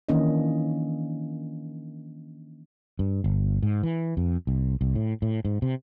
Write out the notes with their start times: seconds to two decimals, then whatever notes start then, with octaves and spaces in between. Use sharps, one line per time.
0.09 D#3 E3 A#3 C#4 D4 D#5
2.99 G2
3.24 G1
3.62 G#2
3.83 E3
4.17 F2
4.47 C2
4.81 C2
4.95 A2
5.22 A2
5.45 G#2
5.62 C3